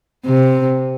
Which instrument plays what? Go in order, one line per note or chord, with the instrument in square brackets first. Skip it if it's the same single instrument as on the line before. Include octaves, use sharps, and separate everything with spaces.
[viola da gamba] C3